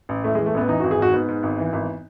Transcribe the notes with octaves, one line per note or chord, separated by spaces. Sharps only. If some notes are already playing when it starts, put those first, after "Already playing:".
A1
A2 A3
E3 G#3
A3
A1 B3
E3 D#4
G#1 F#4
G#4
G#2 F#4
G#2 B3
G#2
G#1
E3
G#1